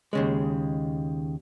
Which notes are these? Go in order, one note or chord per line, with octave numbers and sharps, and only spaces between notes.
D#2 C#3 G#3